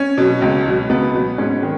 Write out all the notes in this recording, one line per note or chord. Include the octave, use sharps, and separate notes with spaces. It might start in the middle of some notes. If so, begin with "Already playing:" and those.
Already playing: C#4
B2 F#3
C#2
B2 F#3
C#2 B3
B2 F#3
G#2 C#4
D#3